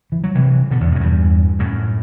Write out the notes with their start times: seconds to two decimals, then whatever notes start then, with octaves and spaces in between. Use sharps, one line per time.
0.12 E3
0.24 F#3
0.35 C3 E3
0.71 B2 D3
0.81 E2
0.91 F#2
0.96 A2
1.00 E2 G2
1.59 F#2 A2